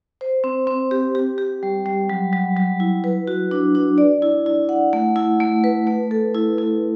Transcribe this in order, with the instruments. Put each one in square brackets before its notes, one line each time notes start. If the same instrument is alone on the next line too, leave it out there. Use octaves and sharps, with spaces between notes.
[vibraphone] C5
C4
C4
G4
G4
G4
G3
G3
F#3
F#3
F#3
E4
B4
F#4
D4
D4
D5
E4
E4
F#5
A3
E4
A3
B4
A3
A4
E4
E4